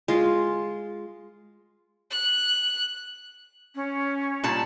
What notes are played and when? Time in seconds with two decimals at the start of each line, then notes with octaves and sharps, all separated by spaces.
0.08 G#3 F4
2.10 F#6
3.75 C#4
4.44 A#2 G3 A5